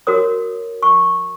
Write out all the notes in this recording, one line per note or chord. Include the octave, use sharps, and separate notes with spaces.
F#4 A#4 C#5 D#6
C#6